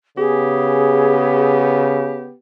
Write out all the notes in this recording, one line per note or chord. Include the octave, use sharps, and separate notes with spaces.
C#3 B3 G4 G#4